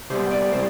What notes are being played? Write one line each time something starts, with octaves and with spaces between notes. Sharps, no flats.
C3 G3 B3 C5
D5
A2 G3 C4 C5